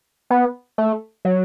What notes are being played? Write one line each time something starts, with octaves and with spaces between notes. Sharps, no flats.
B3
A3
F#3